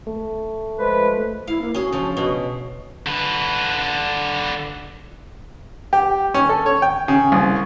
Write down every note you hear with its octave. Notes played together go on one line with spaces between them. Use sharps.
A3
F3 G#3 B4
E4 F5
A#3
C#4 F#4 G#4
C#3 F3
B2
D3 B4
G4
C#4
A4
C#5
G5
C#3
C2